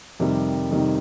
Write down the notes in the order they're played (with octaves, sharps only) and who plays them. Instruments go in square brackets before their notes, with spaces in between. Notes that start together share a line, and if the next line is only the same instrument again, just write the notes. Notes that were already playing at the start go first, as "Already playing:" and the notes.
[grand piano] F2 C3 D#3 G3
F2 C3 D#3 G3